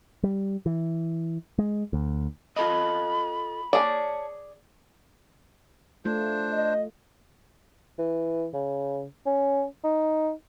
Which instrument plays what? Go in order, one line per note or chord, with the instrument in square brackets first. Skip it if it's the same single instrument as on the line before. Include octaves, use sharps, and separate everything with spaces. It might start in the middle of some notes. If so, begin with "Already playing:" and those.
[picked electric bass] G3
E3
G#3
D2
[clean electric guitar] F4 A4 D#5 [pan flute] B5
[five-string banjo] G#4 D5 [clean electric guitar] C#5 A5
[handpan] A3 F4 [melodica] D4 C5
[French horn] D#5
[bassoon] E3
C#3
C#4
D#4